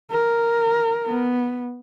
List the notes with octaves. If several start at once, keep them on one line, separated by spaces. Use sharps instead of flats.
A#4
B3